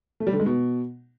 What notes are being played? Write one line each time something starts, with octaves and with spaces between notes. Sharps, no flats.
A3
G3
D3
G#3
B2